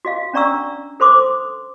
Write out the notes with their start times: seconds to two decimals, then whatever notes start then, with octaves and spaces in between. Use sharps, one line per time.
0.05 F#4 D#5 F5
0.33 C#4 D4 D5 A#5 C#6 E6
1.00 A4 C5 C6 D6 D#6